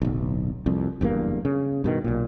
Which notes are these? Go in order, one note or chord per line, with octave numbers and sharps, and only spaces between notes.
D1 B1
C2 F2
F#1 E2 G2 A#3
C#3
G2 B2 D#3
B1 A#2